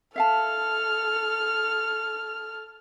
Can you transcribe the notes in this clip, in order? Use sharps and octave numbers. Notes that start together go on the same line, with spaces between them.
A4 E5 F5 A5 F6